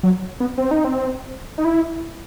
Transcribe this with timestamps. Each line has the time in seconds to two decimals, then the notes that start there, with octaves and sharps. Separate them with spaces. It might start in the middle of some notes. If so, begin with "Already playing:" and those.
0.03 F#3
0.40 B3
0.58 C4
0.71 D#4
0.84 C4
1.58 D#4
1.65 E4